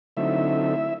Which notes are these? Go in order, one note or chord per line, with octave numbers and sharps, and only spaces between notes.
D3 F#3 A3 C4 D#4 E4 E5